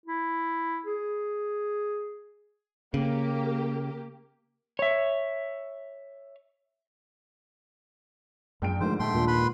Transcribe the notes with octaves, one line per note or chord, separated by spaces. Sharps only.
E4
G#4
C#3 A#3 G4
C#5 E5
A#1 F#2 G5 D7
G#2 D3 D#3 F3 A3 C5
A#2 G3 A3 G5 C6
D#2 A#2
B4 B5 C6